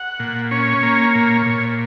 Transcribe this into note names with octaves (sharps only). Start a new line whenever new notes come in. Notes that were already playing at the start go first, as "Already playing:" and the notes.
Already playing: F#5
A#2
C#4 C#5
A#3
A#2
A#2